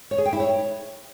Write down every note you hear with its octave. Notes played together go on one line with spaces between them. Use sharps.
C#5
G#4
G5
E4
C#5